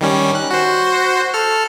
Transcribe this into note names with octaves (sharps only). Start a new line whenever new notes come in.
D#3 G3 C#4
F#6
F#4 C5
A4 F6